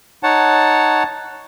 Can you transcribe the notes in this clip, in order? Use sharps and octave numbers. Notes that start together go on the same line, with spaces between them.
D#4 C#5 F#5 A5